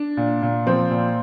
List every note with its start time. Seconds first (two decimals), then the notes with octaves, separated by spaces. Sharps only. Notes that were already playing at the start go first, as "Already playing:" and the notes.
Already playing: D4
0.17 A#2
0.42 A#2
0.66 F3 C4
0.90 A#2